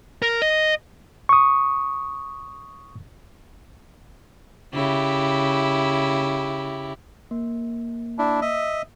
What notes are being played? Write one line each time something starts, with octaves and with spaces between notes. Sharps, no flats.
A#4
D#5
C#6 D#6
C#3 E4 G4
A#3
D4 E4
D#5 E5